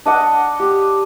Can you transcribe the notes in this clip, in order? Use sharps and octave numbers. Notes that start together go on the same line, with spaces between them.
D4 D#5 F#5
G4